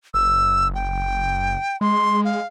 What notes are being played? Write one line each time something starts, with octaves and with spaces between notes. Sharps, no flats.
F#1 E6
G5
G#3 C6
F5